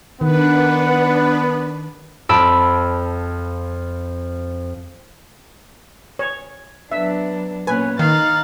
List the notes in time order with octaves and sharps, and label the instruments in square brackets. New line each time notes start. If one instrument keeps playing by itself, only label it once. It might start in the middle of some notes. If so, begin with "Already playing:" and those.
[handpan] D#3 [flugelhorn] B3 [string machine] D4 B4 [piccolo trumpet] F#5
[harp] F2 A5 B5 E6 D7
[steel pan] C#5
[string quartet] F#3 B3 D4 [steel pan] E5
[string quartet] A#2 B3 C#4 [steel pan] B4 [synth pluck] G#5
[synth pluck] D#3 [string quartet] D#4 F#6 A6 [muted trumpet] F5